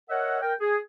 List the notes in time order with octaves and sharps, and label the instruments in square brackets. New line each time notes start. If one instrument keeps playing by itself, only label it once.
[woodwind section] A#4 C#5 D#5 E5 F#5
A#4 G5
G#4